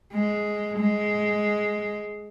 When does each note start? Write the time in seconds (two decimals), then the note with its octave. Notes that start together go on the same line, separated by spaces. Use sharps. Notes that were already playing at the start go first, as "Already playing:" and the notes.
0.13 G#3
0.78 G#3